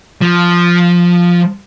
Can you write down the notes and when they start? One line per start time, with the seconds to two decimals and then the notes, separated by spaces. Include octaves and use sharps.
0.21 F3